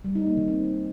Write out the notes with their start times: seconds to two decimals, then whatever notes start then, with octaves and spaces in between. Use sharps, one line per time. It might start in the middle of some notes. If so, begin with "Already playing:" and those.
0.04 G3
0.15 D#4
0.26 A#3
0.37 D#3
0.48 C4